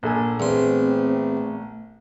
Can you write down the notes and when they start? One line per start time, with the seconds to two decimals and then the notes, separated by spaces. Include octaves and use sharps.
0.03 A#1 A#3 A4 G#5
0.40 E2 A3 C4 C6